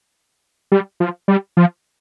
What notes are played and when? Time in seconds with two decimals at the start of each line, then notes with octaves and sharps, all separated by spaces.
0.72 G3
1.00 F3
1.28 G3
1.57 F3